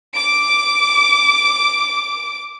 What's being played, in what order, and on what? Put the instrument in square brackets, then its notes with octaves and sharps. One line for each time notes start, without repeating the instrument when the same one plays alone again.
[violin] D6 D7